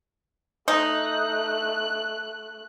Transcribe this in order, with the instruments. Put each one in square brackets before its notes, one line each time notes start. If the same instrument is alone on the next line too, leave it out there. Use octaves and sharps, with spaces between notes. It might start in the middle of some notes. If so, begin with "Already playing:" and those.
[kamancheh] A3 F#6 [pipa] D#4